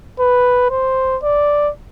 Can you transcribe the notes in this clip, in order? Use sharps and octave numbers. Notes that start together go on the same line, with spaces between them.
B4
C5
D5